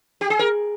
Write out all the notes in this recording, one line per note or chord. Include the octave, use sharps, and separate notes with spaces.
G4
G#4
A#4